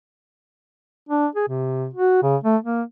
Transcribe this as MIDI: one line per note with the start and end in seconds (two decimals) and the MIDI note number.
1.09 1.27 62
1.35 1.48 68
1.48 1.88 48
1.94 2.18 66
2.22 2.37 49
2.44 2.57 57
2.64 2.82 58